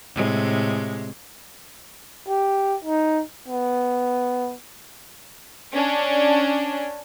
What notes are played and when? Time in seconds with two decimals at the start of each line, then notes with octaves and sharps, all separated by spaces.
0.15 A2 C3 G#3
2.28 G4
2.84 D#4
3.48 B3
5.73 C#4 D4